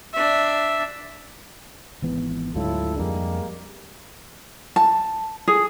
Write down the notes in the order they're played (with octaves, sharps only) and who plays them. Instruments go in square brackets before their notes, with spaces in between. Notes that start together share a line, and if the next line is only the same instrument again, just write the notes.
[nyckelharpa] D4 E5
[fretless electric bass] G#1 E3 B3
[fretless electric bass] D2 G#2 F#3 [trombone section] E4 F4 A4
[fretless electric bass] F2 D4 [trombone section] G3 G#3 A#3
[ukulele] A5
G#4